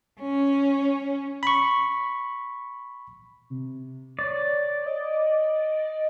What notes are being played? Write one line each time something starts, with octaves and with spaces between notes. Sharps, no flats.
C#4
B5 C#6
C3
C#5 D5
D#5